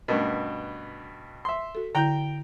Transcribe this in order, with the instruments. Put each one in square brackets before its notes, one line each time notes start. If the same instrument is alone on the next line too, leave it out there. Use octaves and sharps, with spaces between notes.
[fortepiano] G2 B2 [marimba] A3 C#4 A#4
[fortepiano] E5 C6
[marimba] F#4 A4
[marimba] D3 E4 G6 [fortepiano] G5 A#5